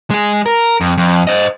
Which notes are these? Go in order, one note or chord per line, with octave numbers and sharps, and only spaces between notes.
G#3 G#4
A#4
F2
F2
C5 D#5